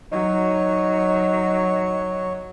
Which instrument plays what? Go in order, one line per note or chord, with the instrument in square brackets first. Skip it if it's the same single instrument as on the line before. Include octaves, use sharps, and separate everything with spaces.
[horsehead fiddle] F#3 [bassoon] D#4 [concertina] C#5